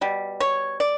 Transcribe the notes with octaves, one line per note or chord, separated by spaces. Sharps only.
B2 G3
C#5
D5